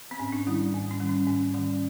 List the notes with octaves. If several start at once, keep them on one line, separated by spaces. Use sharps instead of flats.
C4
G#2 C#4
D4
D#3 G3 E4
G#2
C#4
D#3 G3
C#4
G#2 C#4
D#3 G3 C#4